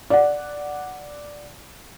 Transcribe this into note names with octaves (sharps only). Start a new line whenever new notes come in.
D5 F#5